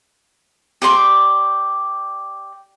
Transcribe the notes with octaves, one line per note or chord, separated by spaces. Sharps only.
G4 D5 C6 D6